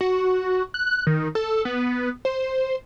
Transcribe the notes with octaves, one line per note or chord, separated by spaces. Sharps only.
F#4
F#6
D#3
A4
B3
C5